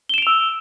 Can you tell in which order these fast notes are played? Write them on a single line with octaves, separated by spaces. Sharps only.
G7 E7 D7 F7 E6